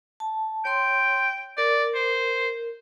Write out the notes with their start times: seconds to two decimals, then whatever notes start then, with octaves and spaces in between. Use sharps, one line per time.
0.20 A5
0.65 C#5 G5 C6
1.58 A#4 D5
1.95 C5